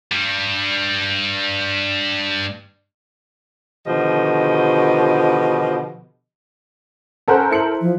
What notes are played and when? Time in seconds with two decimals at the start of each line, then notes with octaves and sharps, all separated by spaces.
0.12 G2 G3
3.87 B2 D3 D#3 F3 G4 D#5
7.28 C#4 A4 A#4 C5 F#5 F#6
7.51 E4 C#7 F#7
7.81 F3